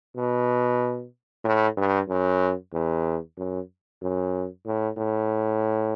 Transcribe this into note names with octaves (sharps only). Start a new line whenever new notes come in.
B2
A2
G2
F#2
E2
F#2
F#2
A2
A2